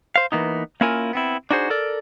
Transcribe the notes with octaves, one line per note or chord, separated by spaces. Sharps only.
C5 F5
E3 A#3 B3 D#4
A#3 C#4 E4 F4 A#4 G#5
B3 C4 E4
D4 D#4 F#4 G#4 C5
A4 A#4 D5